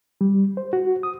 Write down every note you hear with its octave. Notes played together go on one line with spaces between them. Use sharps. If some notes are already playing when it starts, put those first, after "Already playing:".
G3
C5
F#4
D#6